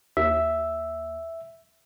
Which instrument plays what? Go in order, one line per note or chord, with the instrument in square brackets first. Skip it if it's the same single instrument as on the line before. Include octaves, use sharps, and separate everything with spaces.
[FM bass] D#2 [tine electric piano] E5